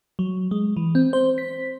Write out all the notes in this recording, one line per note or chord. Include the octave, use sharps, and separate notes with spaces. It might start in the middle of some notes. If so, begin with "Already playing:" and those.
F#3
G#3
E3
C4
C5
B6